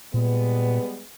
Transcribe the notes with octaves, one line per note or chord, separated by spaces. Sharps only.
A#2 G3 G#3 B3